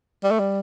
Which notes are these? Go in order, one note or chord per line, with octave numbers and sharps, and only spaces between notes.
G3
A3
G3